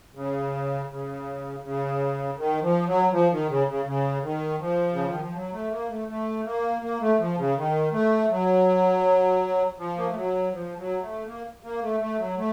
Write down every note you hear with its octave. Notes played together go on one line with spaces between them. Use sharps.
C#3
C#3
C#3
D#3
F3
F#3
F3
D#3
C#3
C#3
C#3
D#3
F3
C#3
D#3
F3
F#3
A3
A#3
A3
A3
A#3
A#3
A3
F3
C#3
D#3
A3
F#3
F3
A#3
A3
F#3
F3
F#3
A3
A#3
A#3
A3
A3
F#3
A3